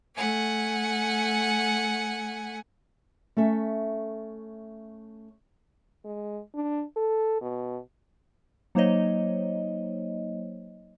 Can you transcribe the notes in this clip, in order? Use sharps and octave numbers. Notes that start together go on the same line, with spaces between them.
A3 F#5 G#5
A3 C#4 A4 E5
G#3
D4
A4
B2
F#3 A#3 D#4 C5 C#5 D#5